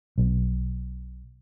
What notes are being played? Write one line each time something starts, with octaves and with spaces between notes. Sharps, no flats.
B1